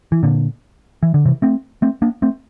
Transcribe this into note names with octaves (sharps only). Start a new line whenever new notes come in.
E3
A#2 D3
E3
D3
C3 E3
A3 C4
A3 C4
A#3 D4
A3 C4